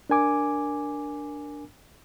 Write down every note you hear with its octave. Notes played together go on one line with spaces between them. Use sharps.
D4 A#4 G#5 D6